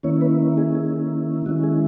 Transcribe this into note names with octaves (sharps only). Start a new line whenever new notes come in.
D#3 A#3 C#4 E4 C#5
B3 B4
G#4
G#4
D#3 G#3 C#4 E4 F#4
G#4